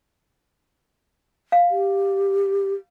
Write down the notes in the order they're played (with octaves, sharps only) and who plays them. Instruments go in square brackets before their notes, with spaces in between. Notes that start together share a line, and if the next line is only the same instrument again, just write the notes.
[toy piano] F5
[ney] G4